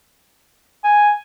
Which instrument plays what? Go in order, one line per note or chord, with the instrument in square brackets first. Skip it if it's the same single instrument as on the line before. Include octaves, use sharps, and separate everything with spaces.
[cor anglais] G#5